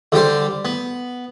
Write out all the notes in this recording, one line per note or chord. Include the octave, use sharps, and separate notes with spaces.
D3 G3 G4 C5
B3